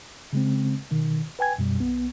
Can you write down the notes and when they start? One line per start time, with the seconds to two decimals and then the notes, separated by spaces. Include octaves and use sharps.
0.33 C#3 G#3 C4
0.91 B2 D#3
1.39 B4 G5 G#5 G#6
1.58 F#2 B2 G3
1.79 B1 B3